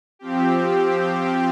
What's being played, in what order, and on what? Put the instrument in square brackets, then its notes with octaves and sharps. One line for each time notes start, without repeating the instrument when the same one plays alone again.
[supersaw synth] F3 C4 G4